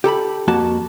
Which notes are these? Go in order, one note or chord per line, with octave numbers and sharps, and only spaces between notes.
G4 A4 A#5 B5
F2 A#3 F#4 A5